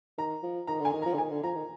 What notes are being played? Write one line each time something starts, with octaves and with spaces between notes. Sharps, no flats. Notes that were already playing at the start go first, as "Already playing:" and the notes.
D#3 A#5
F3
D#3 A#5
D3
G#5
D#3
F3 A#5
D3
D#3 G#5
D3
F3 A#5
D#3